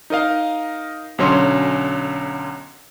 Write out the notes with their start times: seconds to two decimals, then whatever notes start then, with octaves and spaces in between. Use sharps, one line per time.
0.10 D#4 A#4 D#5 F5
1.18 B1 D3 F#3 C#4 C#5 C6